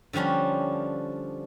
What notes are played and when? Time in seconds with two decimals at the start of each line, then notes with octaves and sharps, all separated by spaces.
0.13 D3 F3 G3 C#4 D4